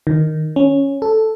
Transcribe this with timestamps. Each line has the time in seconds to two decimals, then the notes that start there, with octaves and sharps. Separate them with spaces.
0.07 D#3
0.56 C#4
1.02 A4